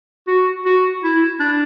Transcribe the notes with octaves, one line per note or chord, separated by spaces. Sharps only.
F#4
F#4
E4
D4